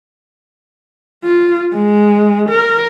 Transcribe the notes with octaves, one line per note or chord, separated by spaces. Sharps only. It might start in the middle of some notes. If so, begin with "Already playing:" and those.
F4
G#3
A#4